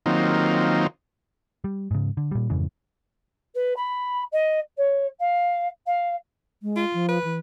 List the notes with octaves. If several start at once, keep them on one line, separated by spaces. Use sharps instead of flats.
D#3 F#3 A#3 C4 D#4 F4
G3
G#2 C#3
D3
A#2 G3
F2 G#2 C#3 E3
B4
B5
D#5
C#5
F5
F5
G#3
F4
F3
B4
E3